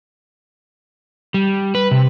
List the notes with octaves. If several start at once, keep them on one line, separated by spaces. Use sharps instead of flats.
G3
B4
C3